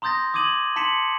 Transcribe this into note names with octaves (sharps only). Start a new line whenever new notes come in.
A#5 C6 D#6 G6 A6 A#6
D6 D#6 G#6 D#7 F#7
A5 C6 B6 C#7 E7 F#7